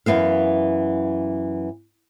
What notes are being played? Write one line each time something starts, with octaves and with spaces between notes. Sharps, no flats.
F#2 C3 E3 B3 F5